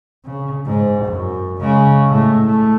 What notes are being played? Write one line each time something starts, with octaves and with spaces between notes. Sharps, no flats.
C#3
G#2
F#2
C#3 G#3
A2 A3
A3